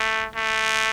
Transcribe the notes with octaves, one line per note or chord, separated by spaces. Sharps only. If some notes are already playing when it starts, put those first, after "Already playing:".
Already playing: A3
A3